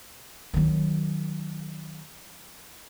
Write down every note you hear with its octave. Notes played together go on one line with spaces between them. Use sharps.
D#3 F#3